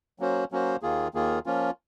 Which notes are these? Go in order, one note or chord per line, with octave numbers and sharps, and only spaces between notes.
F#3 A#3 C#4 F#4 C5
F#3 A#3 C#4 F#4 C5
D#2 D#3 A#3 F4 G#4
D#2 D#3 A#3 F4 G#4
F3 A#3 C#4 F4